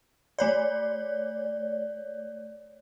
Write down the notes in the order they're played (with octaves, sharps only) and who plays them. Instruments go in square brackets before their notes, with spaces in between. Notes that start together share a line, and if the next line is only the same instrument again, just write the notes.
[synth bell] A3 C#5 D5